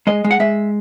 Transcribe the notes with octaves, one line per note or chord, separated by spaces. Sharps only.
G#3 D#5
G#3
F#5
G#3 E5